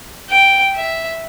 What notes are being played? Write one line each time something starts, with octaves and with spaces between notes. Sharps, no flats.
G5
E5